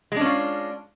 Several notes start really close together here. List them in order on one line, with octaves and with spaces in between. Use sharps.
G#3 D4 C#4 F4